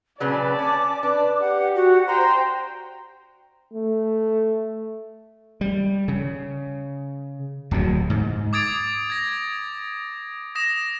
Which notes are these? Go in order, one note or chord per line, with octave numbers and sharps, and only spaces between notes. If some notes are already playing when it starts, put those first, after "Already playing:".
A#2 C#3 F#3 B4 D5 A5
C#4 D6
D4 B4 D6
G4 F#5
F#4 F#5
C5 G5 A#5 C6
A3
G3
C#3
D1 D#2 F#3
G#2
D6 D#6 G#6 A6 D7
G#6 A#6
D#6 A#6 E7